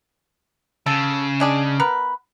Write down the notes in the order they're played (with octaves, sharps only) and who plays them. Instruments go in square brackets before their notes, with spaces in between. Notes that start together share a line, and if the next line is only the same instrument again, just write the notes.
[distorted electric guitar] C#3 [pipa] A4
[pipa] G#3 D4 G#4
B3 A#4 B4